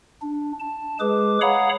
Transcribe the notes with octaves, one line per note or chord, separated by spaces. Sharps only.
D4
A5
G#3 G#4 B4 D6
C#5 F5 F#5 A#5 B5 D#6